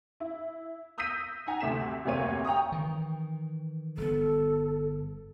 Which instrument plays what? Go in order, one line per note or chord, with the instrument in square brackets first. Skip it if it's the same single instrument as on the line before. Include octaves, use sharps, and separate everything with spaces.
[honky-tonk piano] E4
D#6 E6 G6 A#6 B6 D#7
D#4 F#5 G#5 A#5
D2 C3 A3 B6 E7
F1 D2 C3 A#3 C#5 D#7
G5 A#5 C#6 D#6
[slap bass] D#3 E3
[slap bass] G1 B3 [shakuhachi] A4